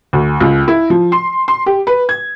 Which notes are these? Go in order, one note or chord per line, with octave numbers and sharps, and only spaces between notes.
D2
C#2
E4
F3
C6
C6
G4
B4
G#6